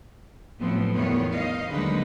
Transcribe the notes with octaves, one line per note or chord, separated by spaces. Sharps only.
A2 F3 F#3 A3 B3 C4
E2 D#3 B3 F4 C#5
D#4 D#5 F5
D#2 D3 F#3 G#3 D#4 B4